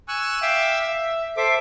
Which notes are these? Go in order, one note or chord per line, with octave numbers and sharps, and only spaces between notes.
G#5 C#6 E6 F#6
E5 F5 G5 D6 E6
E5
A4 C5 E5 D6